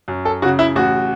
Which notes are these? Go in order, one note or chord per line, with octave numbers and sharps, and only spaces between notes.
F#2
A4
C#3 F#4
E4
A1 F#4